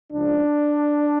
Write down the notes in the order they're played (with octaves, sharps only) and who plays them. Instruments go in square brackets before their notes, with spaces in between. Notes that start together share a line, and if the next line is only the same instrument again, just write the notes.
[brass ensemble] C#2 C#3 F3 D4